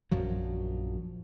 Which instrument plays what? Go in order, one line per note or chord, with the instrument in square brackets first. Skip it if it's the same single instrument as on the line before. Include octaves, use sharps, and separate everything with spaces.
[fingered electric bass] A#1 F#2 F3 F#3